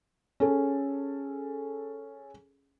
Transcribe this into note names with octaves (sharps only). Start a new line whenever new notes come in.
C#4 G#4 A4